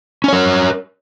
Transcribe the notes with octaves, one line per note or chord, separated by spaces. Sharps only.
C#4 A#4 C#5